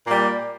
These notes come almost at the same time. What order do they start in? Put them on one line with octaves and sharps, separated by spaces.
A#2 A#3 G3